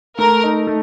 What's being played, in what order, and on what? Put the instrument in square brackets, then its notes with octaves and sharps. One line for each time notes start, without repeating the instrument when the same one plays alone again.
[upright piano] A3 [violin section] A#4
[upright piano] D#4
A3